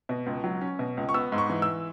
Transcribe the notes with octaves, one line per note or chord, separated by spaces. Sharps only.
B2
C#2
F#3
C#4
B2
C#2
C#6
B3 E6
G#2
C#6
E3
E6